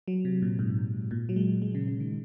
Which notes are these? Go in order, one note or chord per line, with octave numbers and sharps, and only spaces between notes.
F#3
C3
A#2
G#2
A#2
F#3
G#3
G#3
C#3
C#3
D#3